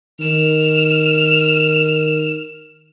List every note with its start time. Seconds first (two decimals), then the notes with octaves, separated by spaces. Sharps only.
0.20 D#3 F6 E7